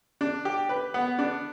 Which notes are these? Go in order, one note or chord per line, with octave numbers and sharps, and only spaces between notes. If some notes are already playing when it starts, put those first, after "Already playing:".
D4
G4
B4
B3
D4